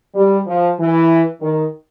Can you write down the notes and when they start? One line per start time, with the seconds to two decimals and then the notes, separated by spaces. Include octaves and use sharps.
0.15 G3
0.47 F3
0.79 E3
1.41 D#3